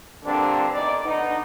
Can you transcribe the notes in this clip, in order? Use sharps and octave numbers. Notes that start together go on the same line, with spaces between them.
G2 A#2 D3 C4 D4
E2 D#4 D5
D3 B3 D#4